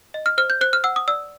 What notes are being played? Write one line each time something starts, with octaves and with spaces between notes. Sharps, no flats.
D#5
F6
C5 F6
G6
C5 F#6
F6
F#5 E6
D#6
D5 E6